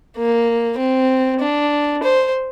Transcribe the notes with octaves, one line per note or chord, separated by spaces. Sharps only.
A#3
C4
D4
C5